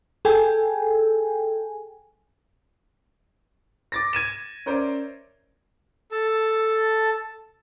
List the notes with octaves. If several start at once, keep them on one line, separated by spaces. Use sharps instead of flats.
G#4 A4 G5 G#5
D6 A6 A#6
G#6 D#7 E7
C#4 A#4 C5 D5 E5
A4 A5